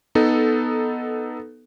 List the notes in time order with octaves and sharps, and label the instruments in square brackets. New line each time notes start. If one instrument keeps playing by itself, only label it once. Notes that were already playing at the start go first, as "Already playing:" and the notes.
[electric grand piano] B3 D#4 A4